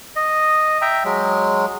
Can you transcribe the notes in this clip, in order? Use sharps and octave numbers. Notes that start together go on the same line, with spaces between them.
D#5
E5 G5 A#5
F#3 G#3